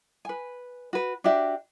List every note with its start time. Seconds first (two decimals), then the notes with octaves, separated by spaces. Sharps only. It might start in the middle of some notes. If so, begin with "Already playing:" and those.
0.25 B4 G#5
0.93 F#4 B4
1.24 D4 F#4 G4 E5